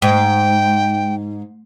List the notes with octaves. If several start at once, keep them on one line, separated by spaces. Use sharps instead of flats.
G#2 G5